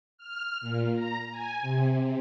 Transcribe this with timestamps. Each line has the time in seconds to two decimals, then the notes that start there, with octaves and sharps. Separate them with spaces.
0.18 F6
0.61 A#2
0.95 A#5
1.31 G#5
1.61 C3